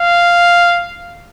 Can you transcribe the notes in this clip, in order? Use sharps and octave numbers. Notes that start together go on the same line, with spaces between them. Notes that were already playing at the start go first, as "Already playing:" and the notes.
Already playing: F5